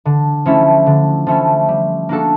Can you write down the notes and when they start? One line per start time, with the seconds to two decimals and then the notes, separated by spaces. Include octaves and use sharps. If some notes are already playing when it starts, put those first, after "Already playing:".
0.05 D3
0.46 F3 A3 C#4 E4
0.86 D3
1.27 F3 A3 C#4 E4
1.69 G3
2.09 A#3 D4 F#4 A4